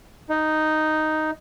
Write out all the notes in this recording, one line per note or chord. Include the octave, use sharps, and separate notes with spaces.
D#4